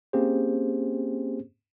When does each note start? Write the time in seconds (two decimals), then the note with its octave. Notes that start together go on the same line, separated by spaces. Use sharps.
0.13 A#3 C4 C#4 G4 G#4 C5